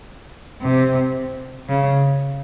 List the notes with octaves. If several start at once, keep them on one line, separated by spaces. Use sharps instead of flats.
C3
C#3